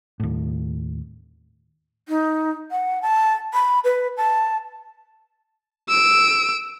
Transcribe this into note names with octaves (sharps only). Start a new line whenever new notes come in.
D#2 A2
D#4
F#5
A5
B5
B4
A5
E6 D7